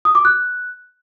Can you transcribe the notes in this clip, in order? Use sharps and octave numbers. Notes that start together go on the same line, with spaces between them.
D#6
D6
F#6